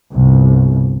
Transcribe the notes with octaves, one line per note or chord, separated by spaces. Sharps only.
G1 C2